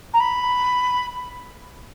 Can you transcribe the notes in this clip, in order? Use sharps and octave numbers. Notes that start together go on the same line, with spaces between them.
A#5
B5